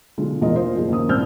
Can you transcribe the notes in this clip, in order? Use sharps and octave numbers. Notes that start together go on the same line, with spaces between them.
B1 D3 G#3 F4
E2 B2 G#3 A#3 F4 D#5
A#3 F4 C5 D#5
F#1 F3 G#4
D#2 A#3 C#4 D#6
C2 G2 C5 E6 F6 G6